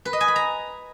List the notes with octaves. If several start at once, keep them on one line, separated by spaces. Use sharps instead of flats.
B4
D#5
G#5
B5
A#5